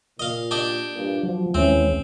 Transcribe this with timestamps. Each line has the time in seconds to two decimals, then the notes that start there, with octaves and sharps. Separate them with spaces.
0.20 A#2 D#5 F5
0.51 D4 G4 D#5
0.94 G2 A#2
1.23 F3 F#3
1.54 D#2 E3 G#3 C4 C#4 E4